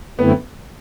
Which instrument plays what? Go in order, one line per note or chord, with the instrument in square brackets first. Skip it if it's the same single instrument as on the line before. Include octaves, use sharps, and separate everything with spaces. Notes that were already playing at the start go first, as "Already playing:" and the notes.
[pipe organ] F#2 D3 A3 C4 E4 [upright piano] B3